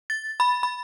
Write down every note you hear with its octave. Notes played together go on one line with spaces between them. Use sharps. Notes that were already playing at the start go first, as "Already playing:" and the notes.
A6
B5
B5